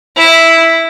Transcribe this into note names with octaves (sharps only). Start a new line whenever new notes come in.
E4